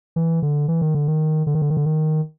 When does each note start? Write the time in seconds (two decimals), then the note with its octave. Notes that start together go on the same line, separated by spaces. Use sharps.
0.16 E3
0.42 D3
0.68 E3
0.81 D#3
0.95 D3
1.08 D#3
1.47 D3
1.55 D#3
1.62 D3
1.70 D#3
1.77 D3
1.86 D#3